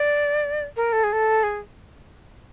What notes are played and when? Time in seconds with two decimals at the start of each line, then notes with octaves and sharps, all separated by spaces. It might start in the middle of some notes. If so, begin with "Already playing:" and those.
Already playing: D5
0.76 A#4
0.93 A4
1.04 G#4
1.13 A4
1.43 G#4